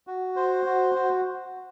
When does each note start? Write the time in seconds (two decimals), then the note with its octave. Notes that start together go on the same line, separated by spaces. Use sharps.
0.07 F#4
0.36 C5
0.66 F#4
0.95 F#4